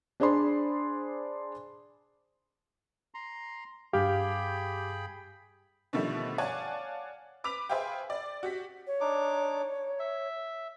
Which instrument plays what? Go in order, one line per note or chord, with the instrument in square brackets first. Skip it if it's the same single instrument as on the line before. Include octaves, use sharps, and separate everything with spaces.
[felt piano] D4 G#4 C5 D5 B5 C6
[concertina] A#5 C6
[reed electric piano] G2 F5 [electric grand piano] G4 [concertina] G#4 G5 B5
[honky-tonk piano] B2 D3 D#3 F3 G3 A3
C#5 D5 F5 F#5 G#5 A5
B4 D6 B6 F7
G#4 B4 C5 E5 F5 G5
D5
F#4 G4 B6
[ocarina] C#5
[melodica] D4 D#4 D6
E5